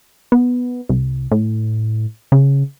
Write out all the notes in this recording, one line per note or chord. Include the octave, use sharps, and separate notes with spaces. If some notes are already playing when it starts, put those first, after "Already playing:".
B3
C2
A2
C#3